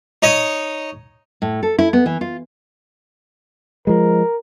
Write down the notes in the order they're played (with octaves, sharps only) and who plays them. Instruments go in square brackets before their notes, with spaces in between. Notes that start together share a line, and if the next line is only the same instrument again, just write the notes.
[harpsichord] D#4 C#5 D#5
[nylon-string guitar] A2
A4
E4
B3
E3
F4
[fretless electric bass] F3 G#3 [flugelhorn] A#4